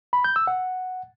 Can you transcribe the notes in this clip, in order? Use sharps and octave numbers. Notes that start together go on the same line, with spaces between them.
B5
G6
E6
F#5